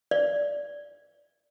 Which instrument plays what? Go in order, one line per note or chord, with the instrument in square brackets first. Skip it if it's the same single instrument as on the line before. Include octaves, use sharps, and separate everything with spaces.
[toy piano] D5